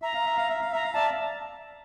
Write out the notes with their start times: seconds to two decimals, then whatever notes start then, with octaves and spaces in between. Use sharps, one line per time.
0.02 E5 A#5
0.14 F5
0.25 E5
0.37 F5
0.49 E5
0.61 F5
0.72 E5 A#5
0.84 F5
0.93 D5 E5 A5